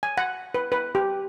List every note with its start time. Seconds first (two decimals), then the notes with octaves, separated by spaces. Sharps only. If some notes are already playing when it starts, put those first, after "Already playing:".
0.03 G#5
0.17 F#5
0.54 B4
0.72 B4
0.95 G4